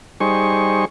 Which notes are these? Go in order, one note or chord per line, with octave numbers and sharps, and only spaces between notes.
G3 D#4 G#4 C5 C#6